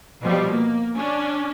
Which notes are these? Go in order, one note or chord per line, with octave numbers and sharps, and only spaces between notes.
B2 F3 G3
A#3
C#4 D4